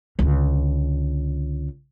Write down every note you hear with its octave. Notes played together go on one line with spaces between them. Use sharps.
C#2 D3